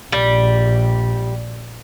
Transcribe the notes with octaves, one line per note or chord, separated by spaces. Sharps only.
A#1 G3